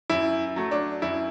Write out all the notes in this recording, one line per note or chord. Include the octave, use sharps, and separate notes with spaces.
F#2 E4
F#3 A3
D4
F#2 E4